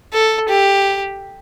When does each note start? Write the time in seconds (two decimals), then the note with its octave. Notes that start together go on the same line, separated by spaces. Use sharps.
0.13 A4
0.49 G4